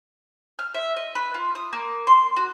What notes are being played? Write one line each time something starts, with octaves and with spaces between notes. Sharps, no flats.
F6
E5
D#5
B4
F4
D#6
A#3
C6
F#4